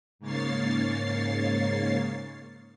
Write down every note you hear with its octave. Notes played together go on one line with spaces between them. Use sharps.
G#2 C#3 A#3 C#5 A6 C7